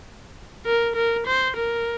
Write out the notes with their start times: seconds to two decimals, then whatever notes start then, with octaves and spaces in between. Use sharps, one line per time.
0.66 A#4
0.96 A#4
1.27 C5
1.56 A#4